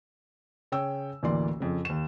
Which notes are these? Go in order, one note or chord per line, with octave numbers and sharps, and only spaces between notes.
C#3 C#5 G5 E6
A1 D2 E3 A#3 D5 C6
F2 C#3
D#2 E7